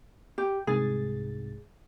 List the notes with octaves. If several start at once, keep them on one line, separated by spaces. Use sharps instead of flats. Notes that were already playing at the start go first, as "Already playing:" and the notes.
G4
C2 G#2 G#4 A6